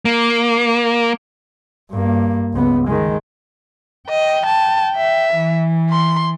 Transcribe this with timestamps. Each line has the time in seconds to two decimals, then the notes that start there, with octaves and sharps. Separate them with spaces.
0.05 A#3
1.91 G2 A#3
2.53 C#2 B3
2.87 D#3 G#3
4.09 D#5 G5
4.46 A5
4.96 E5
5.34 E3
5.90 C6